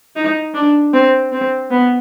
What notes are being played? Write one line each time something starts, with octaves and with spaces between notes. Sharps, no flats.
D#4
D4
C4
C4
B3